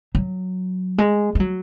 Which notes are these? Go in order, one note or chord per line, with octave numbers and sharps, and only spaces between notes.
F#3
G#3
G#3
F#3